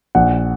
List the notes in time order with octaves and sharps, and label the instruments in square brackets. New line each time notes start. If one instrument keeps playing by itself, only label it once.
[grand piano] A#1 F#5